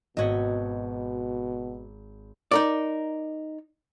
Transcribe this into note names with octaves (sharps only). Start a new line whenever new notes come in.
G#1 B2 F#4 D#5 G#6 B6
D#4 A#4 D5